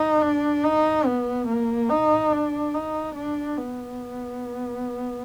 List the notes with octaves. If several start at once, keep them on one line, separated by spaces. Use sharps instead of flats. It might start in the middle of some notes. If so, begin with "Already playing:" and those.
Already playing: D#4
D4
D#4
B3
A#3
D#4
D4
D#4
D4
B3